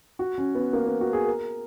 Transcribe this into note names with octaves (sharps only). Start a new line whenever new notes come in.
F#4
C#4
B3
A#3
B3
F#4
G#4
A#4